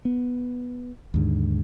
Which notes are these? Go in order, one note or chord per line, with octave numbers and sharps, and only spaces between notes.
B3
D#2 G#2 D3